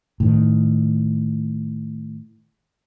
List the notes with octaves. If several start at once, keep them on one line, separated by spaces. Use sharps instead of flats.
A2 D#3